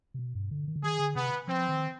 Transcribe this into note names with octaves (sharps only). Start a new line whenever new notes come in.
C3
B2
G2
D3
D#3
D3
D#3 G#4
D3
C3 B3
F3 C4
D#3